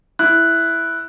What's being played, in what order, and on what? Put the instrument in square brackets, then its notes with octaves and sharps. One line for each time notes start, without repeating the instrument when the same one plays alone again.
[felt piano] E4 [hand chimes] F#6